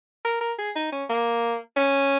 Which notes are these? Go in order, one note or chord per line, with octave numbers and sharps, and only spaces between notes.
A#4
A#4
G#4
D#4
C#4
A#3
C#4